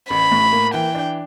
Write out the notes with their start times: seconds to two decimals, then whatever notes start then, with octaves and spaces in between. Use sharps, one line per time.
0.10 A1 B5
0.32 A2
0.52 A#3
0.74 E3 G5
0.95 D4